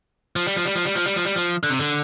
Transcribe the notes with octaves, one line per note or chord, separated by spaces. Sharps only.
F3
G3
F3
G3
F3
G3
F3
G3
F3
G3
F3
D3
C3
D3